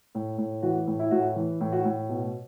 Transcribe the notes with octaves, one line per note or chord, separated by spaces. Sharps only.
A2
A2
E3 F#4
A2
E4
A2 F#4
E4
E3
A2
F#4
A2
B2